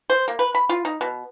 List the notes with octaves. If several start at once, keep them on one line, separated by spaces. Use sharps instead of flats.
C5
A#3
B4
B5
F4
D#4
B2